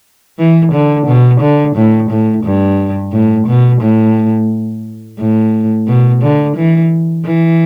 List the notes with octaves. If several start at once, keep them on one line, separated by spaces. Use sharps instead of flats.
E3
D3
B2
D3
A2
A2
G2
A2
B2
A2
A2
B2
D3
E3
E3